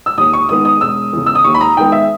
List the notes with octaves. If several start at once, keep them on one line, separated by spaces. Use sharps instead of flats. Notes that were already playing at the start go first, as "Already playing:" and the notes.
E6
D#2 D#6
C#6
D#3 G#3 B3 D#6
D#6
E1 E6
E2 C#3
E6
D#6
D#2 C#6
B5
A#5
D#3 G#3 B3 G5
E5